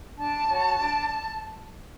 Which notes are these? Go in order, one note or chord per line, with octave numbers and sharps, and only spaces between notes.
D4 A5
F#4 C#5
D4